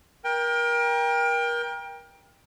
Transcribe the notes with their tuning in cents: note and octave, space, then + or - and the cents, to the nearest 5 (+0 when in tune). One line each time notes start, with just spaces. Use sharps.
A#4 +30 G5 +20